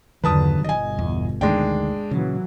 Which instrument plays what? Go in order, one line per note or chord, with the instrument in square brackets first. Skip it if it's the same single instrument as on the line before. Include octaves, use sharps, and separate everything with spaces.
[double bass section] E2 G2 D3 [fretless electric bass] D#3 F#3 [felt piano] B4 A5 D#6
[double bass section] G1 B2 [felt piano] D#5 G#5
[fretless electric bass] E2
[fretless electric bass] D2 D#3 [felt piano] G#3 D4 G5
[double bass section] A#2 E3 F#3 [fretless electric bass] C#3